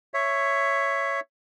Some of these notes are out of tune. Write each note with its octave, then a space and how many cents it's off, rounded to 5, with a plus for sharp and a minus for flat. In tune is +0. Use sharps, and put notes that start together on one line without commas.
C#5 +0 E5 +10